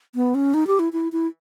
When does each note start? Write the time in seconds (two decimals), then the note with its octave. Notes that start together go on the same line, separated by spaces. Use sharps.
0.15 B3
0.35 C#4
0.54 D#4
0.67 G4
0.79 E4
0.93 E4
1.12 E4